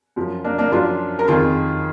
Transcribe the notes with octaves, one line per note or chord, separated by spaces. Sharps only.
F#2 F3
A#3 D4
A#3 D4
F#2 F3 D4 F4
A#4
F2 D#3 F4 G#4